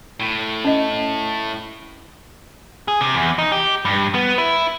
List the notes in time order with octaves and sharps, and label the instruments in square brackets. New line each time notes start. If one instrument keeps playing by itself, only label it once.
[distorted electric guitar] A2
[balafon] C#4 D#5
[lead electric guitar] G#4
C3
E2
D#4
G4
G2
B3
E4